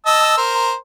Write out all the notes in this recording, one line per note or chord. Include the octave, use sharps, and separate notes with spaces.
D#5 A5 E6
A#4 C5